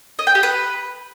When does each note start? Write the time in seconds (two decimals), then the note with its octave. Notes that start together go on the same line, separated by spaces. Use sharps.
0.19 D#5
0.27 G5
0.35 G4
0.43 B4